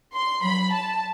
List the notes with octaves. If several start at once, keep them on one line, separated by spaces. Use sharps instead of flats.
C6
F#3 B5
A5